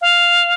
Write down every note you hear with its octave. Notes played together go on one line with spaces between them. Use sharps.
F5